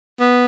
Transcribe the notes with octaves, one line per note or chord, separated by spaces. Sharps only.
B3